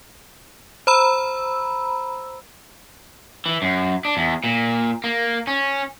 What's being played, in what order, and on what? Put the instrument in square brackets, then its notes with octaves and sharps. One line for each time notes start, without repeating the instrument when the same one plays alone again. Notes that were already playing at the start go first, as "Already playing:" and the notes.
[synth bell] C5 A#5 B5 E6
[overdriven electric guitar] E3
F#2
D4
E2
A#2
A#3
C#4